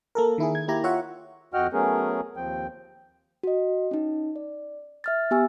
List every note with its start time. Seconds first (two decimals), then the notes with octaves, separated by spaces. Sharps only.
0.15 A#3 A4 A#4
0.38 D#3 E4 G#4
0.55 G#6
0.68 A#3 E4 G4 A#5
0.84 F4 C#5 E5 F#5
1.54 F2 F#4 D#5 F#5 G5 F6
1.73 F#3 A3 B3 C#4 G#4 A#4
2.37 D#2 F3 C4 G5
3.43 F#4 D#5
3.91 C#4 D#4
4.36 D5
5.04 E5 F6 A6
5.31 B3 G4 G#5 E6